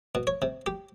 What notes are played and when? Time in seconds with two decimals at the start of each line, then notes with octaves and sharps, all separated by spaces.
0.15 B2
0.27 C#5
0.42 C3
0.66 G4